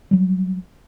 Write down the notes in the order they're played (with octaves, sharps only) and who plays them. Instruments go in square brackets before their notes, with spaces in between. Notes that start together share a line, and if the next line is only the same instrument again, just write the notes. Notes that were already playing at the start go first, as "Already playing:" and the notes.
[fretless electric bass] F#3 G3